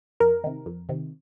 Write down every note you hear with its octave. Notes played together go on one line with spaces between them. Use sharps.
F2 A#4
C3 D#3
F2
C3 D#3